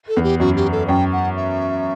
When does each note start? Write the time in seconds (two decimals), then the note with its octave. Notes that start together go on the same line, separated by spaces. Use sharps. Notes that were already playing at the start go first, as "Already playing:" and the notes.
0.08 A4
0.17 E2
0.24 G4
0.40 F#2 F#4
0.56 G4
0.72 A4
0.88 F#2 G5
1.13 F#5
1.36 E5